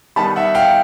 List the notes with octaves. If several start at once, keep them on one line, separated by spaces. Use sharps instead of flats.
D#3 G3 B3 D#4 A5 B5
E5 F#5
F5 G5